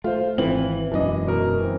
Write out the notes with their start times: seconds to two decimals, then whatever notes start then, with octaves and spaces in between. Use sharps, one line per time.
0.04 A3 F4 C5
0.38 G#1 E3 C4 F#7
0.92 E1 F#2 E3 D4 D#5
1.27 B2 A#4
1.60 E3 C4